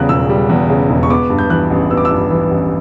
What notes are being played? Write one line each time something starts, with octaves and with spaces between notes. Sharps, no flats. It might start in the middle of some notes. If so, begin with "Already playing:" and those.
Already playing: E2 C#3 G3 F#6
E1 E6
G3
E2
C#3
E1
C#6
B3 D6
G2
G6
E3 F#6
A1
B3 E6
D6
E6
G2
E3
A1